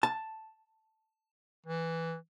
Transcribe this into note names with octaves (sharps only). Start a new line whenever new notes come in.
A5
E3